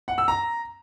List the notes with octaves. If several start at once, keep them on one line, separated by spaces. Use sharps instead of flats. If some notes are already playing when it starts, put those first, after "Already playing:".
F#5
E6
A#5